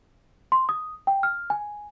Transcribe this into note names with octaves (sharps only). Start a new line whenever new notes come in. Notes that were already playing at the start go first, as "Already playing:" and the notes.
C6
D#6
G5
F6
G#5